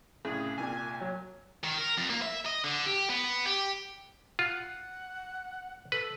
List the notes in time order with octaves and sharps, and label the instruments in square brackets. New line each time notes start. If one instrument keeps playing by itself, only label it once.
[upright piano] C2 A2 C#3 [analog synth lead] G#4
[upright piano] C2 A#2 [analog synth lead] G#5
[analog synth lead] F#3
[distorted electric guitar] D#3
A#4
F2
A#3
E5
D#5
D3
G4
B3
G4
[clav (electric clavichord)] F4 [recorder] F#5
[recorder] A4 [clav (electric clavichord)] B4